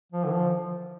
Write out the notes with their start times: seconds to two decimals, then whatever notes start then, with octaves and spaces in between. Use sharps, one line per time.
0.12 F3
0.25 D3
0.32 F3